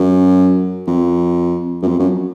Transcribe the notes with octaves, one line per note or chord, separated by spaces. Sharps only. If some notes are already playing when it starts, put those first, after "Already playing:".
Already playing: F#2
F2
F#2
F2
F#2